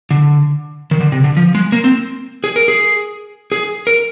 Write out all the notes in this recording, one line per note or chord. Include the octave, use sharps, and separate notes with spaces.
D3
D#3
D3
C3
D3
F3
G#3
A#3
C4
G#4
A#4
G#4
G#4
A#4